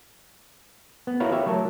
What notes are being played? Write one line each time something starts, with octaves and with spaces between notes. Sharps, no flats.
B3
E4 F#4 A#4 B4 C#5 F5
G4 C#5 E5 F5
F#3 A3 A4 A#4